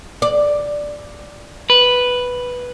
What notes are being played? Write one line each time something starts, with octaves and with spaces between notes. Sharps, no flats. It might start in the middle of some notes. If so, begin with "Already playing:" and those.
D5
B4